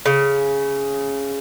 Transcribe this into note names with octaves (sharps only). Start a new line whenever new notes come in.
C#3